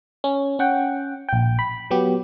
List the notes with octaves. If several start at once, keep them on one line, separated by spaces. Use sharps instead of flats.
C#4
C#4 F#5 G5
A#1 G5
B5
F#3 B3 G4